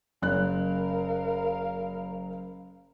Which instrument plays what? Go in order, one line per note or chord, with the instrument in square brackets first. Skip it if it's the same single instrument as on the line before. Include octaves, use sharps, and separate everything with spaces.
[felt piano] F#1 F#6 [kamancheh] A#4 F5